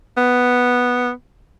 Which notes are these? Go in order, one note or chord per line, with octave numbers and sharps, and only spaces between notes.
B3